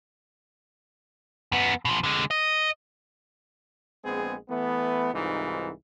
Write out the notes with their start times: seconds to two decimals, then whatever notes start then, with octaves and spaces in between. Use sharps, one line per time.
1.52 F#2 B3
1.85 B2 F3
2.04 D3 G#3
2.31 D#5
4.05 A#1 G#3 B3 C4 G#4
4.50 E3 A3 B3
5.13 C2 G#2 E3 D#4 F4